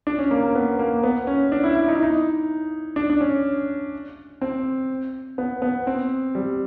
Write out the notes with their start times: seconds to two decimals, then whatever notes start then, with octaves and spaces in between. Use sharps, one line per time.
0.07 D4
0.19 C#4
0.31 A#3
0.43 A#3
0.55 B3
0.79 A#3
1.03 B3
1.27 C#4
1.52 D4
1.64 E4
1.75 E4
1.88 D#4
1.95 E4
2.03 D#4
2.96 D4
3.10 D4
3.21 C#4
4.41 C4
5.38 B3
5.62 B3
5.87 C4
6.35 G3